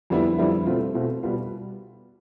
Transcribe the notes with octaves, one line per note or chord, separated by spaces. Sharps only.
F2 D3 G3 B3 E4
F2 D3 G3 B3 E4
B2 A3 C4 F4
B2 A3 C4 F4
B2 G3 B3 F4